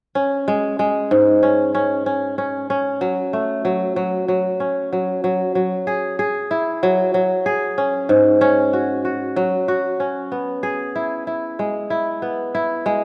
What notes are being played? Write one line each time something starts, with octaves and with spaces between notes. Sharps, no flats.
C#4
G#3
G#3
G#2
C#4
C#4
C#4
C#4
C#4
F#3
A3
F#3
F#3
F#3
C#4
F#3
F#3
F#3
G#4
G#4
E4
F#3
F#3
G#4
C#4
G#2
C#4
F#4
F#4
F#3
F#4
C#4
B3
G#4
E4
E4
G#3
E4
B3
E4
G#3